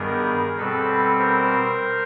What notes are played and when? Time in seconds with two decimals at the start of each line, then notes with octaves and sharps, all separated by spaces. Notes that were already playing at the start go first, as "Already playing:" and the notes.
Already playing: G2 D#3 G3 B3 G#4 A#4
0.57 B2 G3 C4 A4 B4
1.19 A#4 C5